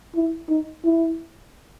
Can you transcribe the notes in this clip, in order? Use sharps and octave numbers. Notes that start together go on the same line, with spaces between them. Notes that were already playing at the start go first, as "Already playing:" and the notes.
E4
D#4
E4